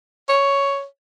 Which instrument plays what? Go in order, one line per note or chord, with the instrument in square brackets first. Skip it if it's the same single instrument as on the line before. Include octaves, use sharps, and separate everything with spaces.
[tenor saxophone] C#5